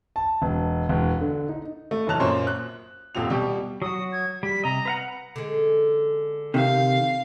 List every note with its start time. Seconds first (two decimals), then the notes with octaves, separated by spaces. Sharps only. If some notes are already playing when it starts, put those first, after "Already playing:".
0.16 A5
0.42 E1
0.89 E1
1.21 D3
1.49 D#4
1.91 A3
2.07 F1 E3 F#3 A5 F#6 F7
2.20 F#2 A#2 C5 C#5
2.47 F#6
3.15 D#1 C4 F4 F7
3.30 B2 G3 G4
3.82 F#3 F#4 D#6
4.12 G#6
4.43 G3 B6
4.64 C3 D#5 A#5
4.85 B4 F5 F#5
5.36 D3 G#3
6.54 C3 D#3 F5